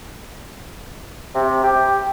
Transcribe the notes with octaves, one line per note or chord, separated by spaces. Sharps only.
C3
G4